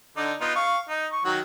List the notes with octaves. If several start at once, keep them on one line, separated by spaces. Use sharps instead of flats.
D3 D#4 D5
B3 D#4 F4
F5 C#6
D#4
C#6
D#3 F#3 F#4